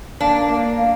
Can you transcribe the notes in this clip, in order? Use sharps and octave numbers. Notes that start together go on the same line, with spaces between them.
A#3 D4
A#3
A#3